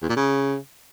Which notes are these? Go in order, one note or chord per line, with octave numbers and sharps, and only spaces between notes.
E2
A#2
C#3